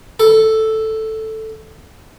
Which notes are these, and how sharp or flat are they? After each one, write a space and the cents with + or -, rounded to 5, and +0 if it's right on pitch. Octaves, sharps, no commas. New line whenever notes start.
A4 +0